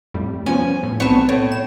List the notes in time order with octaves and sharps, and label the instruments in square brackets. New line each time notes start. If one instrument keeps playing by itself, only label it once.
[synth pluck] F2 A2 G3
[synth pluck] F3 B3 C#4 [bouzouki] G#5
[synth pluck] A2
[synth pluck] B1 C4 C#6 [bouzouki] B3 A5
[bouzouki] A2
[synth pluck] E7